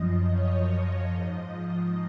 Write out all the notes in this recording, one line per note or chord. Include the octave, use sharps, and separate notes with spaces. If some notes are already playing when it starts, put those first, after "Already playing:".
Already playing: F#2 F3 D#5
C#5
G#2 F3 D#5